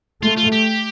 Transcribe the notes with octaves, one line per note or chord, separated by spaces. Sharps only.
A3 F4
F4
G4